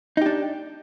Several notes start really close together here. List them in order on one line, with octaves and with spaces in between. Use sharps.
D#4 G4 D4